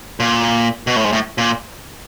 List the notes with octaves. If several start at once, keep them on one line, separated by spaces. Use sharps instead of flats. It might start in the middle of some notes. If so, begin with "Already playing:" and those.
A#2
B2
A2
G#2
A2
A#2